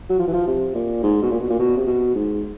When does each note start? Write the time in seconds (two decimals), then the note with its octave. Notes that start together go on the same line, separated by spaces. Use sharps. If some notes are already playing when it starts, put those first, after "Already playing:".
0.10 F#3
0.19 F3
0.28 E3
0.33 F3
0.47 C3
0.75 A#2
1.03 G#2
1.22 B2
1.31 A#2
1.40 B2
1.50 A#2
1.59 B2
1.77 C3
1.87 B2
2.15 G#2